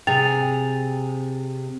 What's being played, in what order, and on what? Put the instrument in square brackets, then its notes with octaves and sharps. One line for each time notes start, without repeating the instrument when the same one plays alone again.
[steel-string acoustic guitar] C3 G#4 [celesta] G5 A6 F7